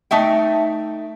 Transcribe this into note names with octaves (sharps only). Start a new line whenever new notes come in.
A3 D#4 E5 G5